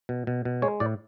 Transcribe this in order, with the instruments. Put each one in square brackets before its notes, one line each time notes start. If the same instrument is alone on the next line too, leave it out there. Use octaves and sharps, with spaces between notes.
[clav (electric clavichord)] B2
B2
B2
G#3 C#5
A2 D5